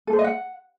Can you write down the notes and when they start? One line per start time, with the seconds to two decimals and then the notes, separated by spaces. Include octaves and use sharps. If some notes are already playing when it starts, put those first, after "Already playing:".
0.07 A4
0.13 C5
0.19 D#5
0.24 F#5